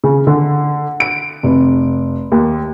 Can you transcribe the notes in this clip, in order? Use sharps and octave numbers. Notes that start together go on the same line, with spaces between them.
C#3
D3
D7
F1
D#2